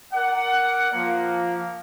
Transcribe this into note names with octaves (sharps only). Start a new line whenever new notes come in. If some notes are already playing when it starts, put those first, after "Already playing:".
A#4 D5 F#5
F3 A#3